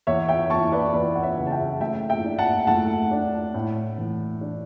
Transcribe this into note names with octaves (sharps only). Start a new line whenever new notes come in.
E2 C#5 E5
E5 G5
E2 A5 C#6
B4 D5
E2 B4 D5
F#5
C#5 E5
C#3
A5
E5 G5
A3 E5 G5
E5 G5
D4
F#5 A5
A3 F#5 A5
D4
A2
E3
D4